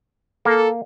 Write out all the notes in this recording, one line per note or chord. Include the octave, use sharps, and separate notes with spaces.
A#3 A4